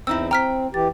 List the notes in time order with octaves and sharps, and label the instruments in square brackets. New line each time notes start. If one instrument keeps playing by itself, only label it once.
[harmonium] E2 [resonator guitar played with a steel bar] C4 D#4 E4 [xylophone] E6
[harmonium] C4 [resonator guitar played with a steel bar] G5 [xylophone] A#5 F6 B6
[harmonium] E3 G4 [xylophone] A6